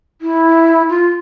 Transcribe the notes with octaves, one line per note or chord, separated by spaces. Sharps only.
E4
F4